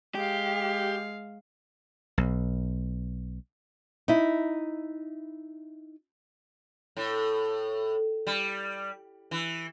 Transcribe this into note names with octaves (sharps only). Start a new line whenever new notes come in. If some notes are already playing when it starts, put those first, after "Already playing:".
G#3 G4 F5
B1
D#4 E4
A2
G3
E3